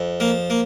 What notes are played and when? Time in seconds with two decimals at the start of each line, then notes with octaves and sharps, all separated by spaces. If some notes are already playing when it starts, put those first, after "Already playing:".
Already playing: F2
0.20 F3 A#3
0.50 A#3